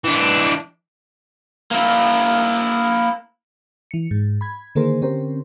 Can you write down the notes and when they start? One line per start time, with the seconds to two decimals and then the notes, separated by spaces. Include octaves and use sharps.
0.04 E3 D4
1.71 A#3 E4
3.91 E3 C#7
4.11 G#2
4.41 B5 G#6
4.75 D3 D#3 A#3 G#4 A#4 C5
5.02 D3 C4 C#4 G4 A#4 C5